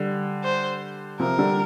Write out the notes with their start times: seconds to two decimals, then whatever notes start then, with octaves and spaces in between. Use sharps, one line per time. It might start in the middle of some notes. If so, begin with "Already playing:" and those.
Already playing: D3 G3
0.44 C5
1.20 C3 F3 A#4
1.38 D3 G3